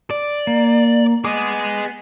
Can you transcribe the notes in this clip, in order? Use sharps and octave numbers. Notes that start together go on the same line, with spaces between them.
D5
A#3
B3 G#4 D#5 D6